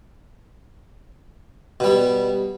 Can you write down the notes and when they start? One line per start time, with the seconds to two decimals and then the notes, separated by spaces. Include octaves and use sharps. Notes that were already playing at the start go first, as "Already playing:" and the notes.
1.80 B2 G3